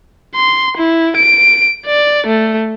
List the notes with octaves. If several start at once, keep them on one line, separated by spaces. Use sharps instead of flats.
C6
E4
D7
D5
A3